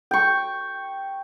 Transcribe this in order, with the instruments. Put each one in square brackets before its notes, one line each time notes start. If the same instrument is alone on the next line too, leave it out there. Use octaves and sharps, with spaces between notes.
[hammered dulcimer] G5 C#6